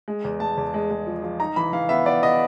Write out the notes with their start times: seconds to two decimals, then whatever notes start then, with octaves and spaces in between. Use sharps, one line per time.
0.08 G#3
0.24 E2
0.40 G#3 A5
0.57 E2
0.74 G#3
0.91 G#3
1.07 F3
1.23 F3
1.40 D#4 A#5
1.56 E3 B5
1.73 E3 F5
1.89 B3 E5
2.06 B3 D5
2.23 B3 D#5